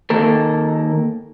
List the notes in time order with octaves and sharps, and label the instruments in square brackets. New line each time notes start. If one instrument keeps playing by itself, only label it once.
[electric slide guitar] D#3 A#3 A4 A#4